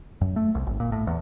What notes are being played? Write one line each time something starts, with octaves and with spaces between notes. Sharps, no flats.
F#2
A3
C2
G#1
A#2
A2
E2